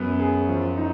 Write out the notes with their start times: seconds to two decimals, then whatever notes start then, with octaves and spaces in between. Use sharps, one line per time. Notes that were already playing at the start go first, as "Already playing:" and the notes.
Already playing: F#2 F#3 B3
0.19 G#4
0.48 F3
0.77 D#4